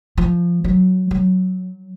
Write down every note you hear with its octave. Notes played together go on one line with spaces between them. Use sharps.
F3
F#3
F#3